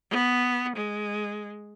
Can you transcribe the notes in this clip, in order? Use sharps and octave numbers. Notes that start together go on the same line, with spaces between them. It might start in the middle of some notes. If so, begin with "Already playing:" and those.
B3
G#3